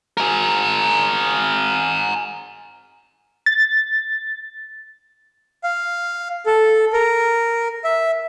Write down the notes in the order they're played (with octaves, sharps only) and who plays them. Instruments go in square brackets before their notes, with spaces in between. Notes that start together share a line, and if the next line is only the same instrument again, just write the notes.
[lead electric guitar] G#4 A#4
[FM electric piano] A6
[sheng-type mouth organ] F5
A4
A#4
E5